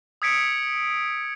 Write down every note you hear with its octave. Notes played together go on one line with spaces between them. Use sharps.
D#6 E6 G#6 B6 C#7 D7